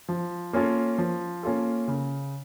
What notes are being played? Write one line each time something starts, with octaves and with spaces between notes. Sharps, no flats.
F3
A#3 C#4 F4 A4
F3
A#3 C#4 F4 A4
C#3